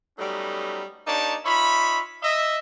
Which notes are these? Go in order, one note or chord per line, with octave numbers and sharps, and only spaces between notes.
F#3 G3 A3 B3 C#4 D#4
A#3 D4 D#4 G4 C#5 A5
D#4 F4 C#5 E5 B5
D#5 E5